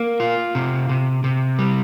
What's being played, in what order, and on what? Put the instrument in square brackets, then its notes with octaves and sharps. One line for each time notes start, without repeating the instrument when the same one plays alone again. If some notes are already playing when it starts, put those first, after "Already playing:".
Already playing: [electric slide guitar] A#3
F4
C3
C3
C3
G3